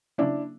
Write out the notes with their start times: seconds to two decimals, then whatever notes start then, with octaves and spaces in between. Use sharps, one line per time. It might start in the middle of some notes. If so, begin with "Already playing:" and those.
0.18 C#3 F#3 A#3 C#4 D4 E4